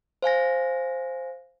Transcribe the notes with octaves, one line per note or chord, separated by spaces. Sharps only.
C5 F5 G#5 A#6